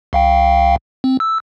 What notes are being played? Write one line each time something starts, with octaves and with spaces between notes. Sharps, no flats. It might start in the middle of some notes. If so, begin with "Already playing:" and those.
C2 F5 G5
C4
E6